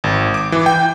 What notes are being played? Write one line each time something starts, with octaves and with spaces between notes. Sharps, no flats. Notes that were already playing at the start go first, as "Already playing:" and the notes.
G#1
D6
E3
G5